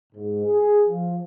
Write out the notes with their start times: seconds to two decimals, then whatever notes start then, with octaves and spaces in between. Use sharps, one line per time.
0.13 G#2
0.44 G#4
0.87 F3